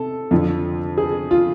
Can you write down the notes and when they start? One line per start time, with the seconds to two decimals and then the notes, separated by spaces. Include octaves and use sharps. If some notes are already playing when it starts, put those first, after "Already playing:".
Already playing: C3 A4
0.31 F2 D3 F3
0.98 G#4
1.31 F4